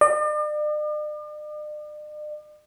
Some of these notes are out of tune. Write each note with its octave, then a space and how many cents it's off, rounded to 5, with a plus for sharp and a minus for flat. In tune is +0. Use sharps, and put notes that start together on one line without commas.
D5 +45